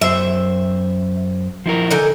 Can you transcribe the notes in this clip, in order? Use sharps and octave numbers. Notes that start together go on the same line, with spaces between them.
F#2 C5 E5
F3 E4 A#4
D3 D#4 G#5